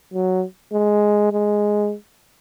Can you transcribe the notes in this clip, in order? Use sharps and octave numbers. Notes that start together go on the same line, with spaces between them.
F#3
G#3
G#3